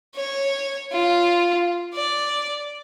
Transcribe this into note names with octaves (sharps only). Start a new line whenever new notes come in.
C#5
F4
D5